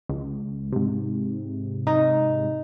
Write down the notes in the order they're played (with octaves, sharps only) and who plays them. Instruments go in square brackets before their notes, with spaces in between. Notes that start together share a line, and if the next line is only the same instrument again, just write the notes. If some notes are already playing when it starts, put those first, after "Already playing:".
[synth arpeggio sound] C#2
G#2 C3
[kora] D#4